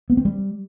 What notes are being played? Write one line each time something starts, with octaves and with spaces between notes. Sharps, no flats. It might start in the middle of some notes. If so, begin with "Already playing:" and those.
B3
C4
G3